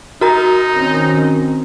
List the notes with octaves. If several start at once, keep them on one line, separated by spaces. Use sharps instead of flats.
D#4 F#4 A#4 A#5
D#3 C4 C#4